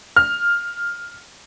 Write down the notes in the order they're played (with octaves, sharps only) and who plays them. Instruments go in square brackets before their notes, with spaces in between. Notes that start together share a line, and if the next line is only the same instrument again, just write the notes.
[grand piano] F6